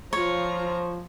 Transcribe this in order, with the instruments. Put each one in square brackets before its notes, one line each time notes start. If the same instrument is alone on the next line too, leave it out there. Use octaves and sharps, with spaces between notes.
[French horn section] F3 [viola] F4 A#5 [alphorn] C5 [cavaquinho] C#5